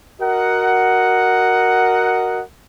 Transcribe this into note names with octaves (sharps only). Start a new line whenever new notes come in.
F#4 A#4 D#5 F#5